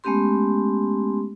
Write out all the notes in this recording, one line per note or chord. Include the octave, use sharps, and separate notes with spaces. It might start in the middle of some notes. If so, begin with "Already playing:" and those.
G#3 A3 B3 C#4 G4 C6